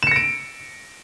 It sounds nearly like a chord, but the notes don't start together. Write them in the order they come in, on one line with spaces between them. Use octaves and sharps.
E7 C#7 A#6 D7